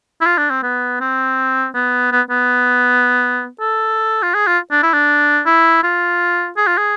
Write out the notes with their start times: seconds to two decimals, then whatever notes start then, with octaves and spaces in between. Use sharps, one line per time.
0.21 E4
0.26 F4
0.38 D4
0.50 C4
0.63 B3
1.00 C4
1.75 B3
2.12 B3
2.30 B3
3.60 A4
4.23 F4
4.35 G#4
4.47 F4
4.72 D4
4.83 E4
4.93 D4
5.46 E4
5.83 F4
6.57 G#4
6.68 F4
6.78 G#4